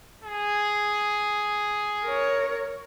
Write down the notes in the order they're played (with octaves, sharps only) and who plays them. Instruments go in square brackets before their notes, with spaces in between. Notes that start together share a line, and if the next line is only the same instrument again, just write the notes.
[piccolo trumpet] G#4
[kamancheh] A#4 C#5